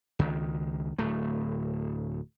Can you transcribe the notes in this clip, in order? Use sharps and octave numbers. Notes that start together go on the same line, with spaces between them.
C#2 D#3
D1 A3